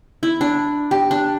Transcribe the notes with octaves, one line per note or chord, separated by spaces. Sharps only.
E4
D4
G4
D4